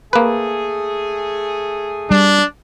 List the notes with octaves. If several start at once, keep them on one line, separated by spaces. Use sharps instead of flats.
A3 A#3 G#4 B4
G3 D4